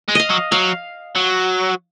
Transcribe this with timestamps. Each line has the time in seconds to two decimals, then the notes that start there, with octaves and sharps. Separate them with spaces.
0.09 G#3
0.15 D#5 F5
0.30 F#3
0.52 F#3 F5
1.16 F#3